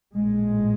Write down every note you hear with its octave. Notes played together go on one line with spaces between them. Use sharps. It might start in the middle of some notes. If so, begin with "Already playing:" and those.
A#1 A2 G#3